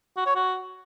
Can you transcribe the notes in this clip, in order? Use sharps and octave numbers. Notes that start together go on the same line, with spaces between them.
F#4
C#5
F#4